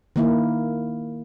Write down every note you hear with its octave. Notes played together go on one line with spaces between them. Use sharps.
D#3 A#3 E4